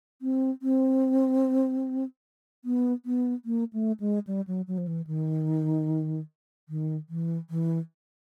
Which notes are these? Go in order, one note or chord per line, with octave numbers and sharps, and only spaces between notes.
C4
C4
B3
B3
A#3
A3
G#3
G3
F#3
F#3
F3
E3
D#3
D#3
E3
E3